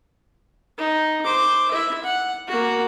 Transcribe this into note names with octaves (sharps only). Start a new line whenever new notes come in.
D#4
C5 D6
E4 E5
F#5
A#3 F#4